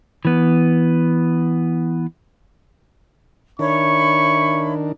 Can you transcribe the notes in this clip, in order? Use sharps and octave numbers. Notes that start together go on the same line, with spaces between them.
E3 B3
D#3 D4 C#5 E5 B5 C#6